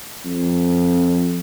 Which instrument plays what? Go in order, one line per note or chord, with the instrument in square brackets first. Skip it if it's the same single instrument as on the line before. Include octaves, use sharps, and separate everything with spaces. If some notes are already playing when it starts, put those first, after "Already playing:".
[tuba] F2